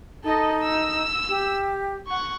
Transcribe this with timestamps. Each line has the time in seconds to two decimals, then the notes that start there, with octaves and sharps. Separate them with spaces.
0.24 D#4 A4 D#5
0.62 E6
1.29 G4
2.08 F#5 C#6